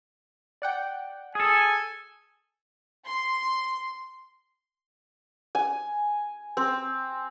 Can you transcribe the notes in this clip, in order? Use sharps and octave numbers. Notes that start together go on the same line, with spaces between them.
D5 F#5 G5
G#4 A4 G#5
C6
G#5
C4